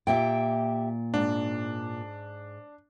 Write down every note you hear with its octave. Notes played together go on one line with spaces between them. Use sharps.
A#2 G4 E5 G5
G#2 D4